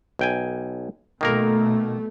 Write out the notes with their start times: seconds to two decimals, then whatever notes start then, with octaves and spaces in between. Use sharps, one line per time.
0.19 B1 G5 G#5
1.21 B2 D#3 A3 A#3 A#4